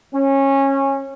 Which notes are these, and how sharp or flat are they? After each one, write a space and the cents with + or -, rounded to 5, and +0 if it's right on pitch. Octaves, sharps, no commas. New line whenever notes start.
C#4 -20